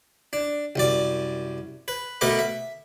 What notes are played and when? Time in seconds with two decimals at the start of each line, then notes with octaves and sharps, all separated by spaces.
0.33 D4
0.76 C2 F#2 D5
1.88 B4
2.21 B2 A3 A#4 B4 D#5 D6
2.39 E5